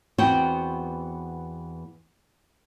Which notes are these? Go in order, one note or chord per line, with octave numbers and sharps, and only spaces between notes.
E2 B3 C4 F#4 F#5 G5